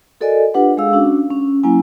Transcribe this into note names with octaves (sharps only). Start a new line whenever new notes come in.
F#4 A4 A#4 D5 D#5 G#5
D4 F4 G4 B4 F#5
G#3 G#4 F5 E6
C#4 D4 F#4
C#4
F#3 A#3 C#4 E4 G#5